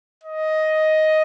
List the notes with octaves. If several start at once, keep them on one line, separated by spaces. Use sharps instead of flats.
D#5